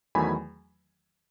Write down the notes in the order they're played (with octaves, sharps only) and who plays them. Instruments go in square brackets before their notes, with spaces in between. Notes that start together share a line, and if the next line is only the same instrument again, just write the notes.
[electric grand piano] E2 D#3 F#3 A3 G#5 B5